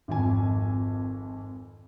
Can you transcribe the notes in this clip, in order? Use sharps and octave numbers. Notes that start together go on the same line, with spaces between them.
G#1 F2 G#5